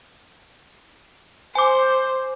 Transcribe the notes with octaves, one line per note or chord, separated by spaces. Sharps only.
C5 G#5 D6